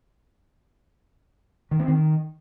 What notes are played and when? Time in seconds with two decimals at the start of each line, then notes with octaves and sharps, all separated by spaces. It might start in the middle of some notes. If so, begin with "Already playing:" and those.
1.71 D#3
1.80 C4
1.88 D#3